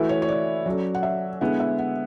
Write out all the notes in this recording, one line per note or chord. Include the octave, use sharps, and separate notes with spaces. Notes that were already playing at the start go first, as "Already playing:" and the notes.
Already playing: E3 A3 E4 F#4 B4
C#5
C#5
D5
F#3 C#4 F#4 A4 C#5
F#5
E5
D3 G#3 B3 E4 F#5
E5
F#5